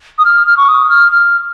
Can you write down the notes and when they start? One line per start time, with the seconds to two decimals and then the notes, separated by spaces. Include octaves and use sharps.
0.18 D#6
0.25 F6
0.47 F6
0.57 C#6
0.68 D#6
0.89 F6
1.12 F6